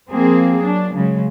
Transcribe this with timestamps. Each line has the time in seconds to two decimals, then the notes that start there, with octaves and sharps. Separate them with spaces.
0.10 F3 A#3 C4 G#4
0.60 F#3 D4
0.95 C#3 F#3 G#3